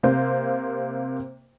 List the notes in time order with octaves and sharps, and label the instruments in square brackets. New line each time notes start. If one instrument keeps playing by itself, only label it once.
[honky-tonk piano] C3 A#3 C5